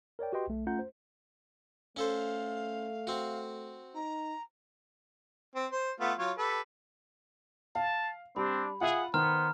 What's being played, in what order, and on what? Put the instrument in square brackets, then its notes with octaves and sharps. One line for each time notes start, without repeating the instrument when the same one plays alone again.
[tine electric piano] A#4 C#5 D5 G5
F#4 G4 B4 D#5 G5 C6
B1 A3
A3 C#4 F4 F#5 A#5 G6
C5
[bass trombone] A3 [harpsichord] C#4 A4 C5 [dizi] F5
[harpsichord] C4 F#4
[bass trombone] D#4 [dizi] A#5
[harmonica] C4
C5
A3 B3 F4
F#3 F4 C#5
G4 A4 B4
[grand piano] F5 [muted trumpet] A5
[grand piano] G3 [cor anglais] C4 [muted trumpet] D4 [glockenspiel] B5
[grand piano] F4 E5 [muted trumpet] G#4 [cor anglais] F#5
[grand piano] D#3 [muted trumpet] B3 [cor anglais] C5 [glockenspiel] A#5 F6